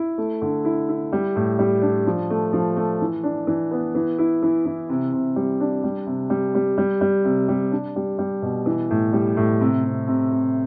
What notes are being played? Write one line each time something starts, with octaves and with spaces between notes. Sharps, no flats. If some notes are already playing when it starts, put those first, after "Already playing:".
Already playing: E4
A3
D3
E4
E4
G3
A2
G3
D4
F3
A3
F3
A3
E3
D4
E3
B3
E3
E4
E3
E3
C3
C3
G3
D4
G3
C3
G3
G3
G3
G3
C3
G3
D4
G3
G3
B2
E3
A2
G3
A2
C3
C3
C3
C3